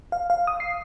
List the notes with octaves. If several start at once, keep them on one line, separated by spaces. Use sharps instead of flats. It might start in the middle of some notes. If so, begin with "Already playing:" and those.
F5
F5
D#6
C7